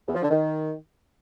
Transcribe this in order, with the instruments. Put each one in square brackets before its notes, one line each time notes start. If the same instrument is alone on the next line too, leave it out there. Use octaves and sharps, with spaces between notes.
[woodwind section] E2
F3
D3
D#3